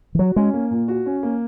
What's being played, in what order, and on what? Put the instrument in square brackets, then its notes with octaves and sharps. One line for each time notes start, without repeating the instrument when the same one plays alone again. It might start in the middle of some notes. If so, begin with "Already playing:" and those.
[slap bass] E3
[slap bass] F#3 [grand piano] F#4
[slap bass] G#3 [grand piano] C#4
[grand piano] A#3
A#2
F#4
C#4
A#3